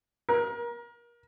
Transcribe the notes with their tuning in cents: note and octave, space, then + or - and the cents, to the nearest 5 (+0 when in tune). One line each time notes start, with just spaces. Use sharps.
A#4 +30